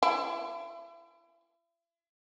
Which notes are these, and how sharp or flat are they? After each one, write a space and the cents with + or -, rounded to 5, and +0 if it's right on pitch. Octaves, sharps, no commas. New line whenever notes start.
E4 +45